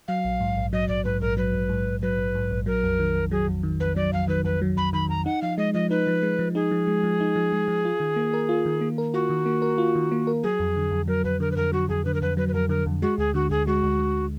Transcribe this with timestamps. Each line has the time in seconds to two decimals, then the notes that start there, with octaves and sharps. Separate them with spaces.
0.08 F#3 F5
0.25 A#1
0.41 G#2
0.57 A#1
0.73 F#3 D#5
0.89 A#1 D5
1.05 G#2 B4
1.21 A#1 A#4
1.37 F#3 B4
1.54 A#1
1.69 G#2
1.86 A#1
2.02 F#3 B4
2.19 A#1
2.35 G#2
2.51 A#1
2.66 F#3 A#4
2.84 F2
2.99 D#3
3.16 F2
3.31 F#3 G#4
3.48 F2
3.63 D#3
3.80 F2 B4
3.96 F#3 D5
4.13 F2 F5
4.28 D#3 B4
4.44 F2 B4
4.62 F#3
4.77 F2 B5
4.93 D#3 B5
5.09 F2 A#5
5.25 D#4 F#5
5.42 F3 F5
5.58 G#3 D#5
5.74 F3 D#5
5.90 D#4 B4
6.07 F3
6.23 G#3
6.39 F3
6.55 D#4 G#4
6.71 F3
6.87 G#3
7.04 F3
7.20 D#4
7.36 F3
7.52 G#3
7.68 F3
7.85 F4
8.00 D#3
8.16 A#3
8.34 A#4
8.49 F4
8.65 D#3
8.81 A#3
8.98 A#4
9.14 F4 F#4
9.30 D#3
9.46 A#3
9.62 A#4
9.78 F4
9.95 D#3
10.11 A#3
10.27 A#4
10.43 F#3 G#4
10.60 F2
10.76 D3
10.91 F2
11.08 F#3 A#4
11.24 F2 B4
11.40 D3 A#4
11.52 B4
11.56 F2 A#4
11.73 F#3 F#4
11.89 F2 G#4
12.05 D3 B4
12.14 A#4
12.22 F2 B4
12.37 F#3 B4
12.48 B4
12.54 F2 A#4
12.69 D3 A#4
12.86 F2
13.02 G#3 F#4
13.18 D2 G#4
13.34 D3 F#4
13.50 D2 G#4
13.67 G#3 F#4
13.83 D2
13.99 D3